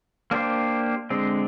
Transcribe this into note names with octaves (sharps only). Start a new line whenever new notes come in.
A#3 D4 G4 C5
D3 G#3 C4